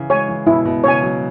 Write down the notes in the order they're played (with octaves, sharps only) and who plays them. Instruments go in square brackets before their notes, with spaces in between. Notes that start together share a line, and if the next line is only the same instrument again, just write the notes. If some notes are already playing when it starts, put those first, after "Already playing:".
Already playing: [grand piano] C#3 E3
[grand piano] G#3 [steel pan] C#5 G#5
[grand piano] E3
[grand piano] B2 [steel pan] E4
[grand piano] B2
[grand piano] C#3 [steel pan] C#5 G#5
[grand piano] F#3